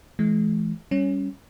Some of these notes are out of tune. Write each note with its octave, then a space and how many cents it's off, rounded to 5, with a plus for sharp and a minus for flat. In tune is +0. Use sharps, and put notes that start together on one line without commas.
E3 +10 G#3 +45
G3 +0 C#4 +0